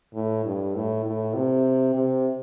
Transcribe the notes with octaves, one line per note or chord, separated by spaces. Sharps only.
A2
G2
A2
A2
C3
C3